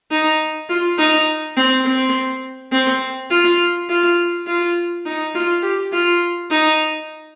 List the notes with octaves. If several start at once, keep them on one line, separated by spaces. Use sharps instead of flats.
D#4
F4
D#4
C4
C4
C4
F4
F4
F4
D#4
F4
G4
F4
D#4